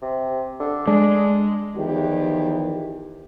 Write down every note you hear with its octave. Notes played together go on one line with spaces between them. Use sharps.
C3
D3
G#3 D4
E2 D#3 F3 G4